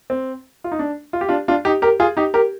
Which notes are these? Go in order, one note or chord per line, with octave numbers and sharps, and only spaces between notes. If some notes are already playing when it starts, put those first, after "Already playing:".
C4
F4
D#4
D4
F4
G4
D4 F4
D4 F4
D#4 G4
G4 A#4
F4 G#4
D#4 G4
G4 A#4